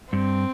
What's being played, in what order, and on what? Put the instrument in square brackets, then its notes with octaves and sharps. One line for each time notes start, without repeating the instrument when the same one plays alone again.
[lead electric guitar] G2 [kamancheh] C4